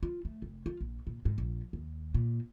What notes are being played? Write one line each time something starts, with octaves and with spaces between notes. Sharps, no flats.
F4
A3
F1
F4
A#1
A#2
G#2
A#1
D#2
A#2